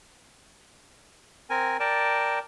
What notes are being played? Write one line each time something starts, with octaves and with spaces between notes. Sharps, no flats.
C4 A#4 G#5
A#4 D5 G5 A5